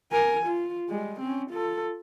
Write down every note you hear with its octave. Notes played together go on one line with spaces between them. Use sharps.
A#4 G#5
F4
G3 G#3
C4 C#4
F4 A4